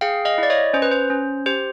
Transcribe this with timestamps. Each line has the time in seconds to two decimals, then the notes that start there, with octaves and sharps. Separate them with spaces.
0.01 G#4 F5 G5
0.25 D#5 F5
0.38 E4 D5
0.50 C#5 D#5
0.74 C#4 C5
0.82 B4
0.91 C5
1.10 C#4
1.46 G4 C5